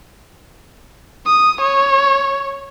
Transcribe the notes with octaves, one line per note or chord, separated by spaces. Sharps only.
D#6
C#5